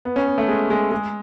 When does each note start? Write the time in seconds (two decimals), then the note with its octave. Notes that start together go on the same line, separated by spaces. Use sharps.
0.05 B3
0.16 C#4
0.27 B3
0.38 A3
0.48 G#3
0.70 G#3
0.92 G#3